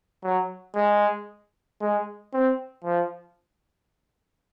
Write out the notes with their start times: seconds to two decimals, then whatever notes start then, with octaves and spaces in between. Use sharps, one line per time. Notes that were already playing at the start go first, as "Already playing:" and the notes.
0.24 F#3
0.76 G#3
1.81 G#3
2.33 C4
2.84 F3